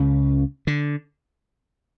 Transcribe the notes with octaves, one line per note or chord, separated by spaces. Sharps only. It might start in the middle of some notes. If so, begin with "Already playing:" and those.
Already playing: C#2 C#3 C#4
D3